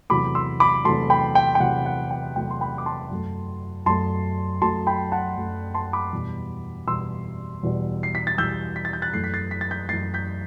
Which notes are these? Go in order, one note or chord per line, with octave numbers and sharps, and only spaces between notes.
E2 C3 F#3 A3 B5 D6
C6 E6
B5 D6
E2 C3 F#3 A3 A5 C6
G5 B5
G5
G5
E2 C3 F#3 A3 F#5
F#5
G5
E2 C3 F#3 A3 G5
C6
G5 B5
D6
A5 C6
F#2 F#3 A3
F#2 F#3 A3 A5 C6
F#2 F#3 A3 A5 C6
G5 B5
F#5 A5
F#2 F#3 A3
A5 C6
B5 D6
E2 B2 G3
E2 B2 G3 C6 E6
E2 B2 G3
C7
B6
A6
E2 B2 G3 E6 G6
B6
A6
G6
F#6 A6
F#2 E3 A3 C7
B6
A6 C7
B6
A6
G6 B6
F#2 E3 A3 A6 C7
G6 B6